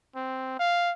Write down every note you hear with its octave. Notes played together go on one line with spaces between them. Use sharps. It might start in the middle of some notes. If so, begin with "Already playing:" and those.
C4
F5